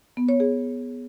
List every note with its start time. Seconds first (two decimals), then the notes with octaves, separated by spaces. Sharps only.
0.17 B3
0.29 C#5
0.40 G#4